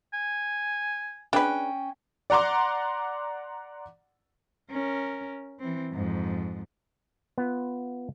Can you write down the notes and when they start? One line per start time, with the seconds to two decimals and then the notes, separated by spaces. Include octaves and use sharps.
0.13 G#5
1.33 C#4 D4 G#4 B4 G5
2.30 D5 F#5 A#5 C6 D6
4.71 C#4 A#4
5.59 E3 C4
5.92 F2 G#2
7.38 B3 F4